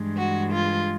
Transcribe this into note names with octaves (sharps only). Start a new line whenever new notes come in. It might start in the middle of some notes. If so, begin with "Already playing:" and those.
Already playing: G2 E3 G#3
F#4
F4